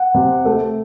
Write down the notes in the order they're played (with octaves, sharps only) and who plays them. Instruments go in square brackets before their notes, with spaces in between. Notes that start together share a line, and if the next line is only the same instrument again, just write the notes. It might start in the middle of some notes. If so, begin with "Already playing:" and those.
Already playing: [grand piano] F#5
C3
A3